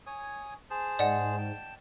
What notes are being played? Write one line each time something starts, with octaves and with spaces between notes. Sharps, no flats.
C#5 G#5 D#6
G#4 C5 A5
G#2 D5 D#5 F#5
G5 A5